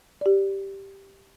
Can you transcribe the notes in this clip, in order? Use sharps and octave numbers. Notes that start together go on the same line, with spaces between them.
G4 D5